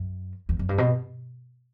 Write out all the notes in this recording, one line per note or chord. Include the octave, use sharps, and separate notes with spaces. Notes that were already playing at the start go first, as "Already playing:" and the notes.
Already playing: F#2
E2
F#2
G2
B2